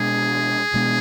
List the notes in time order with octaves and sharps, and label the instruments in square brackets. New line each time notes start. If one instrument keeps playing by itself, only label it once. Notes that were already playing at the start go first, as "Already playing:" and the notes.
Already playing: [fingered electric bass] B2 G#3 B3 D4 [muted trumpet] G#4
[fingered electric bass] B2 G#3 B3 D4